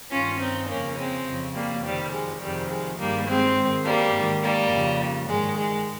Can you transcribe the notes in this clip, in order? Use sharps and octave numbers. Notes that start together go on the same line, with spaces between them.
G2 D#3 C#4 F4
C4 D#4
F2 C#3 A#3 C#4
G#3 C4
F2 C#3
G3 A#3
F2 C3 D#3 G3
G#3
F2 C3 D#3 G3
G#3
G2 D#3 G3 A#3
G#3 C4
G#2 D#3
G3 A#3
G#2 D#3
G3 A#3
F2 C#3
G#2 D#3 G#3
G#3